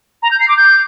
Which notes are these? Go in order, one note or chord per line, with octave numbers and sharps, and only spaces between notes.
A#5
G6
C7
D6
G6